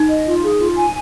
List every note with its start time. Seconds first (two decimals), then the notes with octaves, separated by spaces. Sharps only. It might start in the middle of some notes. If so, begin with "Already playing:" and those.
Already playing: D#4
0.09 D#5
0.27 F4
0.42 G#4
0.59 F4
0.76 G#5